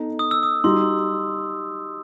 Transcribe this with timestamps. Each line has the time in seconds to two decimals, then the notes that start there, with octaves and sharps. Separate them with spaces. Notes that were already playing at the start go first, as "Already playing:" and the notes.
Already playing: B3 D#4 A4
0.19 D#6
0.31 E6
0.43 D#6
0.64 G3 D#4 F#4 C6